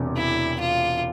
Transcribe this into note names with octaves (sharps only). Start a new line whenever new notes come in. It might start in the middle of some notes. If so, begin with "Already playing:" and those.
Already playing: E1 E2 C3
E4
F4